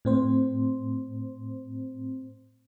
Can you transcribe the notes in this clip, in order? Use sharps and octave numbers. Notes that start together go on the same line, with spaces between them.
A2 C4 C5